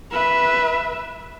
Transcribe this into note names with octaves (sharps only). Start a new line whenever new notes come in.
B4 E5